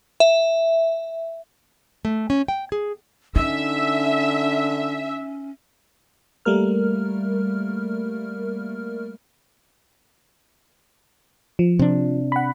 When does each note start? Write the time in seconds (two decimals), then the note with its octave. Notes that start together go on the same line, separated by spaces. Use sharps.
0.20 E5
2.05 A3
2.30 C#4
2.48 G5
2.72 G#4
3.36 D3 C#4 D#4 E5
6.45 G3 A3 A#3 A#4 F6
11.59 F3
11.79 C3 D4
12.32 F#5 B5